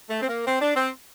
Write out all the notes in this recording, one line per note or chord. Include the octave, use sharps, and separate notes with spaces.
A3
C4
A#3
C4
D4
C4